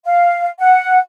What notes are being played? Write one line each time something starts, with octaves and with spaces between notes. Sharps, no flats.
F5
F#5